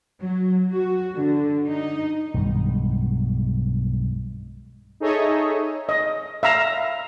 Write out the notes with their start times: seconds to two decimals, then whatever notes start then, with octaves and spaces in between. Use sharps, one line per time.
0.20 F#3
0.71 F#4
1.17 D3
1.69 D#4
2.34 B1 G2 D#3 G#3
5.00 D#4 G#4 A4 C#5 D#5 E5
5.89 D#5
6.43 E5 F5 A#5